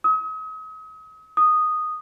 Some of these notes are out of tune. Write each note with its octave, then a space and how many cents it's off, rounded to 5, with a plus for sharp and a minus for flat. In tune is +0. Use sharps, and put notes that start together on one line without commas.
D#6 +40
D#6 -5